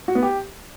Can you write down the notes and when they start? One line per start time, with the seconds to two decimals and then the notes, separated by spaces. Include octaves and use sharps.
0.08 F#4
0.15 B3
0.23 G4